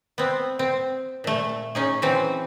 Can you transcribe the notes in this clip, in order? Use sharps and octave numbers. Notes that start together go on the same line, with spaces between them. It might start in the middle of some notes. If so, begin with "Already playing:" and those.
B3 C4
C4
A#2 A3
C#4 D#4 G#4
E3 F#3 C4